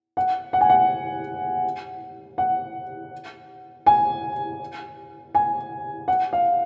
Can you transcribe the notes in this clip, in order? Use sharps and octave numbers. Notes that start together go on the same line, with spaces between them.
F#5
F#5
G#5
F#5
F#5
G#5
G#5
F#5
F5